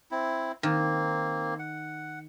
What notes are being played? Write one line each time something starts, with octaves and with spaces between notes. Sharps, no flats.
C4 E4
D#3 A#3 C4
F#5